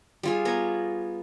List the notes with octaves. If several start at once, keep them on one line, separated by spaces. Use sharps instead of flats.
G3 F4 G#4
B3 C#5 A#5